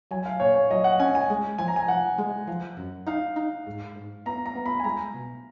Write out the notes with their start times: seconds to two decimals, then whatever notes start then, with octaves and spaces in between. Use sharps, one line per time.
0.11 F#3 G#5
0.26 F5
0.40 A#2 C#5
0.55 C#5
0.70 F#3 D#5
0.84 F#5
0.99 C#4 G#5
1.15 G#5
1.30 G#3
1.58 F3 G#5
1.68 A#5
1.76 G#5
1.88 F3 F#5
2.18 G#3
2.47 F3
2.77 F#2
3.07 D#4 F5
3.36 D#4
3.67 G#2
3.96 G#2
4.26 B3 A#5
4.46 A#5
4.55 B3
4.66 B5
4.80 G#5
4.84 G#3 A#5
5.14 B2